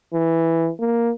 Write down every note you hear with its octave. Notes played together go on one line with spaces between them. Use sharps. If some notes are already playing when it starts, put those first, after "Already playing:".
E3
A#3